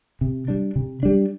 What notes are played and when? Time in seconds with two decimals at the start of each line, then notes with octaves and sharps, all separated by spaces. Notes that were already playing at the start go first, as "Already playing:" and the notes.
0.21 C3
0.48 G3 D4
0.76 C3
1.03 G3 D4